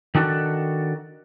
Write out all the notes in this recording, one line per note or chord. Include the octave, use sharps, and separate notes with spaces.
D#3 D4 F#4 A4